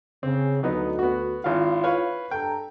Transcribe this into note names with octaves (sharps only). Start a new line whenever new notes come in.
C#3 C4
D2 F#3 B3 D#4
B3 F#4
G#1 E4 F4 F5
B4 C#5 F5
G2 A4 G5 A#5